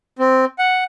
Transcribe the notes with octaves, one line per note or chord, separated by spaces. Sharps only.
C4
F#5